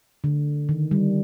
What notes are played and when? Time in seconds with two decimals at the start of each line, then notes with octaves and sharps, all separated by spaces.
0.24 D3
0.69 D#3
0.91 G3